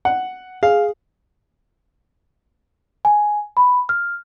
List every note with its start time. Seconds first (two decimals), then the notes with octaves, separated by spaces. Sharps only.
0.05 F#5
0.63 G#4 F5
3.05 G#5
3.57 B5
3.89 F6